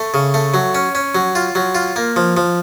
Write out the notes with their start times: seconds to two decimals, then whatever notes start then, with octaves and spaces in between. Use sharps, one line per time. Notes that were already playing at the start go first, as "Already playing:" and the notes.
Already playing: A3
0.14 C#3
0.34 A3
0.54 F#3
0.75 C#4
0.95 C#4
1.15 F#3
1.35 F4
1.55 F#3
1.75 F4
1.96 A#3
2.16 F3
2.37 F3